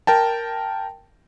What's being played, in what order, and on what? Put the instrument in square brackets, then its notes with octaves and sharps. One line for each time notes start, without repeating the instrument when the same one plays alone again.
[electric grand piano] A#4 G5 A5